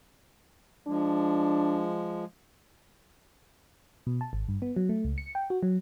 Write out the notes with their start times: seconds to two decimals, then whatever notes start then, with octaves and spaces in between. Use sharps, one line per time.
0.87 F3 G#3 D4
4.07 B2
4.21 A5
4.33 G#1
4.48 G2
4.62 B3
4.76 F#3
4.89 A3
5.04 C#2
5.18 C#7
5.35 G5
5.50 F#4
5.63 F#3